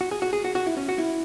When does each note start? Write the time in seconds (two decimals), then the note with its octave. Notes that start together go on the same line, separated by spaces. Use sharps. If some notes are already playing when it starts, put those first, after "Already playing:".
0.01 F#4
0.11 G#4
0.22 F#4
0.33 G#4
0.44 F#4
0.55 F#4
0.66 E4
0.77 C#4
0.89 F#4
0.98 E4